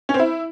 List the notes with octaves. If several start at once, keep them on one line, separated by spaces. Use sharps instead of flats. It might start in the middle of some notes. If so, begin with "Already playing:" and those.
C#4
C4
E4